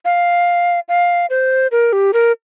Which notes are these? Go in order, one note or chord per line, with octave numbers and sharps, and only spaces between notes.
F5
F5
C5
A#4
G4
A#4